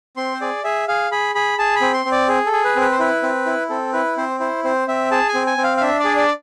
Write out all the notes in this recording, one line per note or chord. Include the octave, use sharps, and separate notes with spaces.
C4 C6
C5
G#4 D5
G#4 E5
G#4 F5
G#4 B5
G#4 B5
G#4 A5
B5
C4
C6
C4
D5
G#4
A4
G#4
B4
C4
B4
C5
E4 B4
C4
E4
C4 A4
E4 B4
C4 C5
E4 C5
C4 C5
C4 E5
G#4 A5
G#5
C4
G#5
C4
F5
F5
D4 E5
D5
G#4
D5